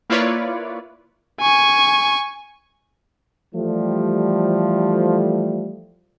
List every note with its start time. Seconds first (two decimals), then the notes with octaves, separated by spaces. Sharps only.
0.10 A#3 E4 F4 B4 C#5 D5
1.40 G#5 C#6
3.54 E3 F3 G3 A3